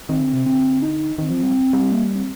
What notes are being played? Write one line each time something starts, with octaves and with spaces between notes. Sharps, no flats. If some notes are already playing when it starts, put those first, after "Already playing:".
D#3 C4
D3
C3
D3 C4
D#4
D#3 C4
F3
G3
G3
C4
A#3
C4